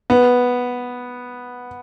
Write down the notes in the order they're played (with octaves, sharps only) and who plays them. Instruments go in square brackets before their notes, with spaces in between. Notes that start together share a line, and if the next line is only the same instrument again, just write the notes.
[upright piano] B3